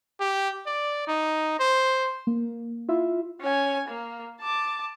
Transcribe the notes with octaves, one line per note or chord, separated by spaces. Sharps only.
G4
D5
D#4
C5
A#3
E4 F4 E5 F5
C#4 G#5
A#3
A5 D6